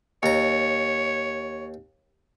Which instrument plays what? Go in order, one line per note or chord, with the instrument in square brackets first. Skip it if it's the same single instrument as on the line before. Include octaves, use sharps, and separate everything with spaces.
[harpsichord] D#2 A#5 [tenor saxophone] C#5